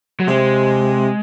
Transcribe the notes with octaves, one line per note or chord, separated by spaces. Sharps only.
F#3
C3 G#3